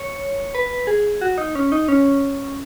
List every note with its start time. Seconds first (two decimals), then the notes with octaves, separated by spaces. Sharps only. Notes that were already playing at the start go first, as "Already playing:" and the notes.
Already playing: C#5
0.55 B4
0.87 G#4
1.21 F#4
1.38 D#4
1.55 C#4
1.72 D#4
1.88 C#4